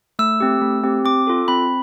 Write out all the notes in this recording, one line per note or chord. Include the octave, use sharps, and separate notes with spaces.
A3 E6
C4 G4
A3
C4 G4
C4 D6
F4 A4
C4 B5